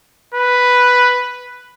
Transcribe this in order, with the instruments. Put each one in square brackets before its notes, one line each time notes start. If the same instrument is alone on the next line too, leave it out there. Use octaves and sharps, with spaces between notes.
[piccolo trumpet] B4